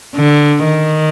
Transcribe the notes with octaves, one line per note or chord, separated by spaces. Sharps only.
D3
D#3